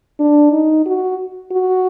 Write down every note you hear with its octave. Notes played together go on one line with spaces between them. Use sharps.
D4
D#4
F#4
F#4